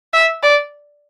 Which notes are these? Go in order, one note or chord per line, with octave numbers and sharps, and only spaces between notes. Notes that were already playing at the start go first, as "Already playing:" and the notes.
E5
D5